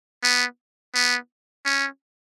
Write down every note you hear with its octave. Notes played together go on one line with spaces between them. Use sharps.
B3
B3
C#4